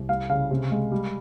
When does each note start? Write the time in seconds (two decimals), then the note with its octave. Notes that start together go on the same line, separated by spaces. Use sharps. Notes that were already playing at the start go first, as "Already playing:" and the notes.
Already playing: C2
0.09 G3 F5
0.29 C#3 F5
0.51 C3
0.71 G#3
0.92 G3